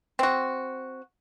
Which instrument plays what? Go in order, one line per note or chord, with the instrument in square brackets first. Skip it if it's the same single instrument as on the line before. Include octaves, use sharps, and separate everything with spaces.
[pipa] C4 F#4